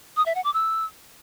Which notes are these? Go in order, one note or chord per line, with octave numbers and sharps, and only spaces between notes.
D#6
E5
F#5
D6
E6